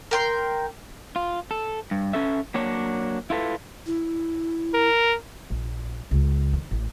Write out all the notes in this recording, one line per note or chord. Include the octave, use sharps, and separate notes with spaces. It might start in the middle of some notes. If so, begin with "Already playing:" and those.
A#4 G5 C6
F4
A4
G2
C#4 A4 E5
F#3 A#3 D4 C#5
E4 F4 A4 B4
E4
A#4
A#1
C#2
D#3
A1